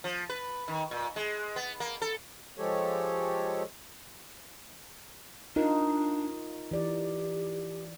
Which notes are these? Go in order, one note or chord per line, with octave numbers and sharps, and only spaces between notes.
F3
B4
D#3
A#2
G#3
B3
A#3
A4
F3 G#3 G4 A4 C#5
D4 D#4 F4 A#4
E3 G4 D5